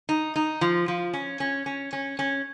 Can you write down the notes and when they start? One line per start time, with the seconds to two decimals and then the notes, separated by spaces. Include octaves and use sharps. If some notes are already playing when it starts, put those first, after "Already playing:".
0.09 D#4
0.36 D#4
0.61 F3
0.88 F3
1.13 C#4
1.40 C#4
1.66 C#4
1.93 C#4
2.19 C#4